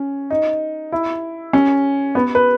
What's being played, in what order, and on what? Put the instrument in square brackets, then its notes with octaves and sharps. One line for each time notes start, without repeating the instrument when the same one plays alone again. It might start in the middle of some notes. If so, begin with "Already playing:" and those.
Already playing: [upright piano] C#4
D#4
E4
C#4
B3
B4